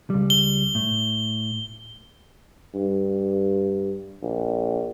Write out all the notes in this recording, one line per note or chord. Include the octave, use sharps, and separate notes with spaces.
C#2 G3
G7
A2
G2
A#1